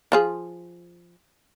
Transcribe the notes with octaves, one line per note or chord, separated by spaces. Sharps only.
F3 F4 G#4